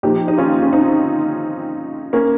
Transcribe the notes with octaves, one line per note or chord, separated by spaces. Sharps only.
A#2 F3 D#4 G4
D#4
C#4 F4
C#4
C4 D#4
A#3 C#4